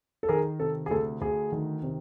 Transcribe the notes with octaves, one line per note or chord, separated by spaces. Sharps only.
A4
D#3 G#4 A#4
C3 A4
G#4
D2 A4
D2 G#4
D#3
C3